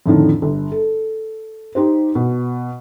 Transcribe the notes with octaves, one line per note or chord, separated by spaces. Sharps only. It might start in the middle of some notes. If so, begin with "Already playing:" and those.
F2 A2 D3 D#3
G1
A4
D#4 G4 C5
B2